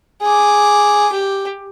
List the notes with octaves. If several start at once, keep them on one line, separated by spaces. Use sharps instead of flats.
G#4 D6
G4